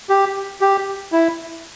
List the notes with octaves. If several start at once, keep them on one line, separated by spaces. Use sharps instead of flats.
G4
G4
E4